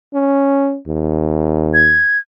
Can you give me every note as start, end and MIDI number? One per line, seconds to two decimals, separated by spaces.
0.14 0.78 61
0.87 2.02 39
1.74 2.19 92